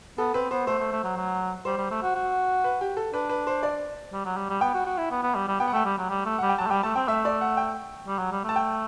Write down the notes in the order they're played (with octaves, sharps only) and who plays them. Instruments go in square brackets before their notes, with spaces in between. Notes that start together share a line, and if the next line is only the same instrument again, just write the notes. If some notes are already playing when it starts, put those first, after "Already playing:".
[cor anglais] B3 [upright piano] A4
[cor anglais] C4 [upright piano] B4
[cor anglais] B3 [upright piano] C5
[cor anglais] A3 [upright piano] C5
[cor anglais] A3
A3
F#3
F#3
[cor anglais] G3 [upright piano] C5
[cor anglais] G3
A3
F#4
F#4
[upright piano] B4
G4
A4
[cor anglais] D4 [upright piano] B4
[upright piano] B4
C5
D5
[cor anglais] G3
F#3
G3
G3
[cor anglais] B3 [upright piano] G5
[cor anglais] F#4
F#4
E4
B3
B3
G3
G3
[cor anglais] B3 [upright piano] G5
[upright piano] F#5
[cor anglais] A3 [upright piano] G5
[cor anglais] G3
F#3
G3
A3
[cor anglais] G3 [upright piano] F#5
[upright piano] G5
[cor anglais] F#3 [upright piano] A5
[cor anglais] A3
[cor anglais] G3 [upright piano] G5
[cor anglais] A3 [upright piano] A5
[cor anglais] C4 [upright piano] G5
[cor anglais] A3 [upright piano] E5
[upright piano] D5
F#5
G5
[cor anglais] G3
F#3
G3
[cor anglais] A3 [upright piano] A5
[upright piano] G5